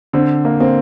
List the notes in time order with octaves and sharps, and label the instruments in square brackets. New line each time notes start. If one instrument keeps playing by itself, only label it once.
[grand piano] D3 [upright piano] C4
[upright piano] A#3
[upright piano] A#3 [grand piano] C4